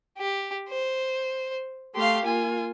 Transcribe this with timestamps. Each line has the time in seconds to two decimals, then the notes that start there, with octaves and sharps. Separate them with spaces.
0.18 G4
0.69 C5
1.95 A3 G4 F5 C6
2.26 A#3 F4 G#5